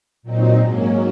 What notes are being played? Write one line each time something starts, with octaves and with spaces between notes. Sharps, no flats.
A#2 F#3 C4 D#4
G#2 F#3 A#3 C#4